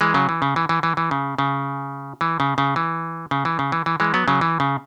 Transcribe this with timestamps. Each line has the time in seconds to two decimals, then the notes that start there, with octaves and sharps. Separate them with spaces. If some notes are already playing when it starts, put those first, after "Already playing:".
0.01 E3 G#3
0.14 C#3 F#3
0.29 E3
0.42 C#3
0.56 E3
0.69 E3
0.83 E3
0.97 E3
1.11 C#3
1.39 C#3
2.21 E3
2.40 C#3
2.58 C#3
2.76 E3
3.31 C#3
3.45 E3
3.59 C#3
3.72 E3
3.86 E3
4.00 E3 G#3
4.14 F#3 B3
4.28 C#3 F#3
4.41 E3
4.60 C#3